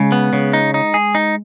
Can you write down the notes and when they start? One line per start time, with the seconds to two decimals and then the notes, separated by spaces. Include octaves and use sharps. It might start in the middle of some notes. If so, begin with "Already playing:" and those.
Already playing: C#3 G#3
0.12 B3
0.33 C#3
0.53 D#4
0.74 D#4
0.94 G#4
1.15 D#4